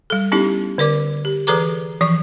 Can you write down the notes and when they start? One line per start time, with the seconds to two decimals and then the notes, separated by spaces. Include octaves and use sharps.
0.10 G3 A4
0.32 B3 C#4 D#4 E4 G4
0.78 D3 A#4 D5 D6
1.25 G4
1.47 E3 G#4 A4 B4 A#5 D6
2.01 E3 F3 D5 C#6